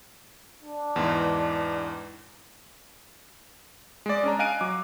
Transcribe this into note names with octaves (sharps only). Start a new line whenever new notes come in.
D4
E2 G#2 E3
G#3 D5
C#4 D4 A#5
D#5 F5 G#5 F#6 D7 D#7
F#3 D6